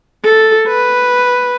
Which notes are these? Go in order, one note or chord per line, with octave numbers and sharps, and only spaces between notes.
A4
B4